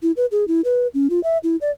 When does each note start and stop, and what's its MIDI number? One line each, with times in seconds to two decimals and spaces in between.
0.03 0.12 64
0.17 0.26 71
0.32 0.45 68
0.48 0.61 64
0.64 0.87 71
0.94 1.08 61
1.10 1.22 65
1.23 1.38 76
1.44 1.56 64
1.61 1.71 74